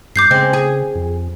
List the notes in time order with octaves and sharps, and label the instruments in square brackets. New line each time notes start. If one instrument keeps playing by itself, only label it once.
[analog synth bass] G2 [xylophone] D6 G6 C7
[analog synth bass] C#3 [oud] G#3 C4
[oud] G#4
[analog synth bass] F2